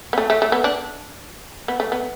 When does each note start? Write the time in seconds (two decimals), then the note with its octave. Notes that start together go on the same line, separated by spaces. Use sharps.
0.13 B3
0.18 A3
0.30 A3
0.42 A3
0.52 B3
0.64 D4
1.68 B3
1.80 A3
1.92 B3